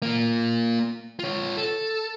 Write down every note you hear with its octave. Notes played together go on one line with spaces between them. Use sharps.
A#3 F4
F4 C#5
A4